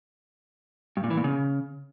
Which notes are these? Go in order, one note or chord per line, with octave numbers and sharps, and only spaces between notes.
G2
A#2
E3
A#2
C#3